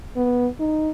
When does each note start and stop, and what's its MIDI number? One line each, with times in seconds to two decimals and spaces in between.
0.16 0.47 59
0.60 0.90 63